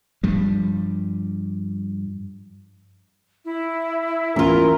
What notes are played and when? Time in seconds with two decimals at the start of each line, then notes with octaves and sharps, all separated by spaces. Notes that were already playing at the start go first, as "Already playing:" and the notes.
0.23 G2 F3 G3
3.44 E4
4.36 D2 E3 A#3 C#4 F4 A#4